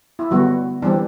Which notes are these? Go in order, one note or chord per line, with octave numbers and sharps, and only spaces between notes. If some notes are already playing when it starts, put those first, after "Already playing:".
E4
D3 F#3 G3 B3 F#4
E3 G3 C4 D4